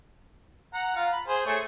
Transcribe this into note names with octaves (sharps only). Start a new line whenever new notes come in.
F#5 A#5
F4 F5 A#5
B5
G#4 C5
A3 G#4 C#5